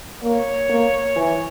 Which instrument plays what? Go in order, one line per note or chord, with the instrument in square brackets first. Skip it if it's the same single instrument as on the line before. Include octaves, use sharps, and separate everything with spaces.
[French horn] A#3 [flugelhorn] C#5
[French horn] A#3
E3